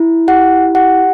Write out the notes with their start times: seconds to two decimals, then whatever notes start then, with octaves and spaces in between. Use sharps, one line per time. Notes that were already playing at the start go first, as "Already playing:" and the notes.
Already playing: E4
0.28 G4 F#5
0.75 G4 F#5